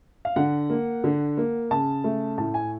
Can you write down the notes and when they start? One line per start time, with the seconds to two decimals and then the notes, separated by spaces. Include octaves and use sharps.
0.25 F5
0.36 D3 F#5
0.70 A#3
1.04 D3
1.37 A#3
1.71 C#3 A5
2.04 A3
2.38 A2 A5
2.54 G#5